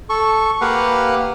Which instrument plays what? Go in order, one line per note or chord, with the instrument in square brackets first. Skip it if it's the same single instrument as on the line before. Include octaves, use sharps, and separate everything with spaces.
[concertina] A4 C#6
A#3 G4 B4 F5 F#5